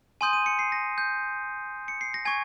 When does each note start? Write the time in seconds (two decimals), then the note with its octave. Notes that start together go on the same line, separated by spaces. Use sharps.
0.21 G#5 C6 D#6 G6 D#7
0.33 D#7
0.46 C#7
0.59 C7
0.72 A#6
0.98 G6
1.88 C#7
2.01 C7
2.14 A#6
2.25 G#5 C#6 G#6